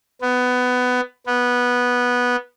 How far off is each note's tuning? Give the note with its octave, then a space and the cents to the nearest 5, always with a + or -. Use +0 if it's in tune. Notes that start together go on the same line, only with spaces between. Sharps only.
B3 +15
B3 -10